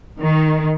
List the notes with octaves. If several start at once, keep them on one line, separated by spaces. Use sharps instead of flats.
D#3